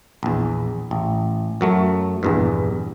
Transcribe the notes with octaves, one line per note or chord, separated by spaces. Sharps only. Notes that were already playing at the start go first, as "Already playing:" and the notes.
A#1 E2
A1
F#2 F#3 A3
A#1 E2 G2